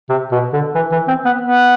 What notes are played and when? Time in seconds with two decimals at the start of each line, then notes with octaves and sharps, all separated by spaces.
0.10 C3
0.32 B2
0.53 D3
0.75 E3
0.92 E3
1.08 C4
1.25 B3
1.41 B3